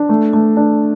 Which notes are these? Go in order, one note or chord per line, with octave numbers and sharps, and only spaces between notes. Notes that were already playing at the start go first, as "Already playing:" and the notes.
Already playing: D4
A3
A3
D4